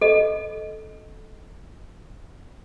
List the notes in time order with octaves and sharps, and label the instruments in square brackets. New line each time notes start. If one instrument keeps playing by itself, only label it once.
[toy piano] A4 D#5